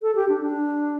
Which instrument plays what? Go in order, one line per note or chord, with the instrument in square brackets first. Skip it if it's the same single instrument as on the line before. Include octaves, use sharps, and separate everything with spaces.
[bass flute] A4
G4
D4
D4